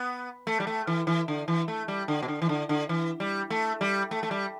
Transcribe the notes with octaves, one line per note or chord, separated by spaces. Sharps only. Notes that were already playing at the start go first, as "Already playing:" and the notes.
Already playing: B3
A3
G3
A3
E3
E3
D3
E3
A3
G3
D3
B2
D3
E3
D3
D3
E3
G3
A3
G3
A3
A3
G3